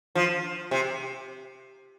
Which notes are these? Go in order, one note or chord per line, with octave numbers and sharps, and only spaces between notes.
F3
C3